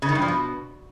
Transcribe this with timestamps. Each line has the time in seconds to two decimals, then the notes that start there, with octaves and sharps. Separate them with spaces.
0.02 C#3
0.09 D#3
0.15 G2
0.22 F3
0.28 B2